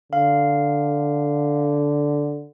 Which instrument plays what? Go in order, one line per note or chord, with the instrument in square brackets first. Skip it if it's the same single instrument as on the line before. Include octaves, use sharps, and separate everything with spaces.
[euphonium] D3 [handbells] F5